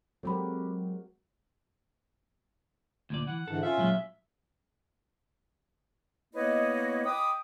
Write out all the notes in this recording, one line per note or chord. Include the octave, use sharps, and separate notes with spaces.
F#3 G#3 C4 F#4 G4 A4 A#4 B5
D2 A#2 D5
E3 F#5
G#2 D3 E3 A4
C#4 F4 E5 F5
A#2 F#3 G#3
A#3 B3 E4 B4 C#5 D#5
D#5 G5 B5 D6 D#6